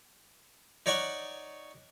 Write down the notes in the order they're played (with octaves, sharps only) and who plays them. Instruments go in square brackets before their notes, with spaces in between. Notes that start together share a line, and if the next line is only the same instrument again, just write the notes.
[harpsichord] D#4 C#5 D5 F#5 C#6